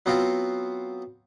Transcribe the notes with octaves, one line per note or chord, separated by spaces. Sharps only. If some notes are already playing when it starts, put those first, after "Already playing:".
F#3 B3 C4 F4 F#4